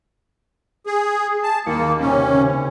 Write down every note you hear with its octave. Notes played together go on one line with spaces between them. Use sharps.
G#4
A5
D#2 A#3 C#7
C3 A#3 C#4
C#3 C#5